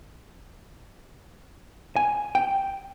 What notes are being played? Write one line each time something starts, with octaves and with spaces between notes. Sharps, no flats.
G#5
G5